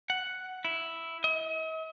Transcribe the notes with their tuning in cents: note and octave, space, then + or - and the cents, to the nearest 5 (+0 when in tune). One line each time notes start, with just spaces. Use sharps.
F#5 +5
E4 +0
D#5 +45